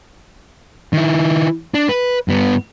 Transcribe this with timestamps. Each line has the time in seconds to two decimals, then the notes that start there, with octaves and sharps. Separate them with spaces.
0.93 D#3 E4
1.74 D4
1.89 B4
2.28 G2 B3